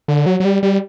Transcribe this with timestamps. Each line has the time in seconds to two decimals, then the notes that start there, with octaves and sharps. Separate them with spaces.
0.08 D3
0.26 F#3
0.40 F#3
0.45 G3
0.63 G3